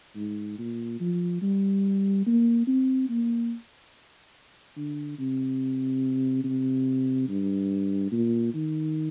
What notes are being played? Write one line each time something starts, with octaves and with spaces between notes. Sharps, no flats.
G#2
A#2
F3
G3
A#3
C4
A#3
D3
C3
C3
G2
A#2
D#3